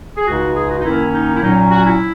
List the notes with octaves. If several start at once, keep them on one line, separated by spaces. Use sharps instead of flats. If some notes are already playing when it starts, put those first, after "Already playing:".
G#4
C#2 C#3 G#3 D#4 F#4
G#4
F#4
D#4
F#2 D#3 A#3 C#4 E4
D#4
E4
A#2 F#3 C#4 D#4
F#4
E4